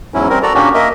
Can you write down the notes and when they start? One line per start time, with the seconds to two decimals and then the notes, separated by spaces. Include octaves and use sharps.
0.14 E2 G#2 F#3 C#4 E4
0.30 G3 C4 A#4
0.43 F#4 A4 D5 A#5
0.54 A#2 A#3 C#4 D4 F#4 G4
0.74 A#3 A#4 D#5 E5